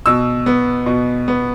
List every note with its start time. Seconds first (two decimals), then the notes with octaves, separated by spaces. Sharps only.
0.06 B2 E6
0.46 B3
0.86 B2
1.28 B3